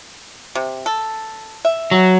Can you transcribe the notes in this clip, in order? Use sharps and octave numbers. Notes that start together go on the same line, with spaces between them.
C3
A4
E5
F#3